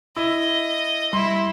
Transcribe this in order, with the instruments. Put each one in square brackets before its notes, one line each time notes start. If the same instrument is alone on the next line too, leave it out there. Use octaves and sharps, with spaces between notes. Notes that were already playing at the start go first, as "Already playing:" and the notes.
[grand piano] E4 [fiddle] D#5
[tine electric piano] G3 [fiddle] E4 [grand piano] C6